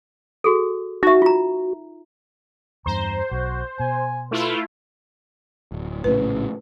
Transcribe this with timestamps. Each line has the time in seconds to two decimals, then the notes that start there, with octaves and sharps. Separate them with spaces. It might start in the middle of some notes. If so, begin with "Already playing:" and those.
0.44 F#4 G#4 A4
1.03 D#4 F#4 E5
1.22 F4 A#5
2.86 E2 G2 C5 A#5
3.31 B1 F#4
3.80 B2 G#5
4.31 A3 E4 F4 B4
5.72 D1
6.04 A#1 A2 C#3 B4